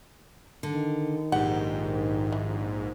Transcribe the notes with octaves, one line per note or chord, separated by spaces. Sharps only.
D3 D#3
A#1 G#2 G4 F#5
E3